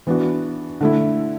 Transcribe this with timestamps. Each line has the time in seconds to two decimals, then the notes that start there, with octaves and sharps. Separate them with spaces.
0.07 E3 B3 D4 F#4
0.81 D3 A3 E4